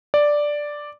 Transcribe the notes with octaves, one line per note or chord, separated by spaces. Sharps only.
D5